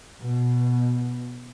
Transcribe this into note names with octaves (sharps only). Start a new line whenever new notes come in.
B2